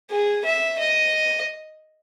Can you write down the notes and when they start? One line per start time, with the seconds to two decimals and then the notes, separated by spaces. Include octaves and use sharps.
0.10 G#4
0.45 E5
0.79 D#5